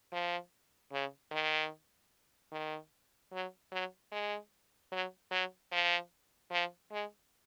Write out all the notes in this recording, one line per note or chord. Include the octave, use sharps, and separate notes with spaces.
F3
C#3
D#3
D#3
F#3
F#3
G#3
F#3
F#3
F3
F3
G#3